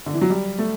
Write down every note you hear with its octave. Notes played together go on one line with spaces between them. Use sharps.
D3
E3
F#3
G3
A3